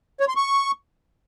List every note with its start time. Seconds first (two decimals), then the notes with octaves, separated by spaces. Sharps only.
0.20 C#5
0.28 C6
0.36 C#6